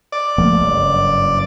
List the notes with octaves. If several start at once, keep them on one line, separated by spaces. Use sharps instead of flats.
D5
F3 A3 A#3
F#1 G2